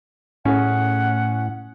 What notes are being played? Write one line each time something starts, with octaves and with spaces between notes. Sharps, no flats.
A2 C#4 G#4 F#5